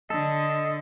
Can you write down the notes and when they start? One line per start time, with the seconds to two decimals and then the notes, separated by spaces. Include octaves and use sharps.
0.10 D3 A4 D#5